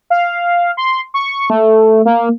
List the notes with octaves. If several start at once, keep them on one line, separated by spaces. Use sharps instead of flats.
F5
C6
C#6
A3
A#3